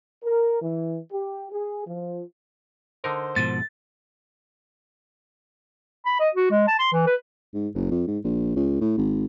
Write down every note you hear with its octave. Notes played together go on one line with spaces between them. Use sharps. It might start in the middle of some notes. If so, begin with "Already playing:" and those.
A#4
E3
G4
G#4
F3
D3 D#4 A#4 C5
G#2 B2 F3 A6
B5
D#5
F#4
G#3
A5
C6
E3
B4
G#2
F#1
F2
G#2
A#1
C#2
A2
G#1